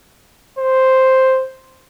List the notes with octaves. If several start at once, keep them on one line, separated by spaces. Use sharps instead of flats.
C5